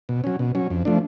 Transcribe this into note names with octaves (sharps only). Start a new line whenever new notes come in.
B2
F#3 C#4
B2
F#3 C#4
F2
F3 A3 D4